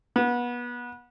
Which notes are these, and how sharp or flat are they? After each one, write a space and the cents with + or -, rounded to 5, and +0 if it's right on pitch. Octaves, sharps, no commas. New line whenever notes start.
B3 -25